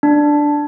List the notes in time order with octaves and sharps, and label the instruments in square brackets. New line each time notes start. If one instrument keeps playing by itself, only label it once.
[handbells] D4